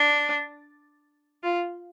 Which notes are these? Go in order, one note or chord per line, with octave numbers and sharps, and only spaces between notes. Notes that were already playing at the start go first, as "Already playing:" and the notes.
Already playing: D4
F4